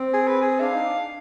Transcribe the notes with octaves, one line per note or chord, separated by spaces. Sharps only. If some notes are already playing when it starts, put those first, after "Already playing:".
Already playing: C4
G#4
B4
G#4
D4 F5
D#4
D4